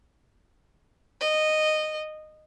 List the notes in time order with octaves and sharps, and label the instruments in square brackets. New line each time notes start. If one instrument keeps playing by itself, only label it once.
[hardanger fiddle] D#5